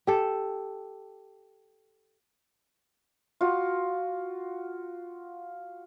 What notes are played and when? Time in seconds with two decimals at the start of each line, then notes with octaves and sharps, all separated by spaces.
0.07 G4 A4
3.41 F4 F#4